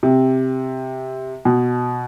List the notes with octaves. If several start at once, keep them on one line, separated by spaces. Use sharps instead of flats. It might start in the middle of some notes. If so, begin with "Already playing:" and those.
C3
B2